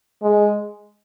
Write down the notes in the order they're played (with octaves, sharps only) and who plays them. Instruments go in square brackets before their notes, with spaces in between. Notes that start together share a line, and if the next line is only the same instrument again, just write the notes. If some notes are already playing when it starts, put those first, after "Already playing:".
[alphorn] G#3